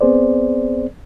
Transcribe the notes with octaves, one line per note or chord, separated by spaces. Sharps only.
B3 C4 G#4 C5 D5